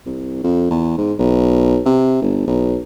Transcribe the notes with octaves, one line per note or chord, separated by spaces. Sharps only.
C2
F2
E2
G#2
B1
C3
G1
B1